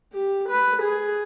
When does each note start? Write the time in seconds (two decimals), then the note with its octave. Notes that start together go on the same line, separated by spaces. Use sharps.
0.13 G4
0.49 B4
0.82 G#4